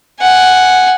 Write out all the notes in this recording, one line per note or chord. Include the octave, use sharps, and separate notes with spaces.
F#5 G#5